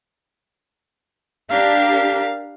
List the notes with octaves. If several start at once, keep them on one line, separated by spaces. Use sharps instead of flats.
D4 G4 A#4 F5